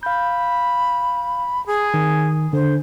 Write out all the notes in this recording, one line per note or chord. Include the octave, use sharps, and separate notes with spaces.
F5 B5 G6
G#4
D#3
D3 C5